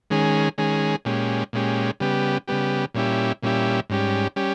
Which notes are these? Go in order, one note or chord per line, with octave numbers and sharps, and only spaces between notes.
D#3 G#3 C#4 G#4
D#3 G#3 C#4 G#4
A#2 G#3 C#4 G4
A#2 G#3 C#4 G4
C#3 G3 B3 G4
C#3 G3 B3 G4
A#2 G3 C#4 E4 G4
A#2 G3 C#4 E4 G4
G#2 G3 C#4 G4
G3 C#4 G4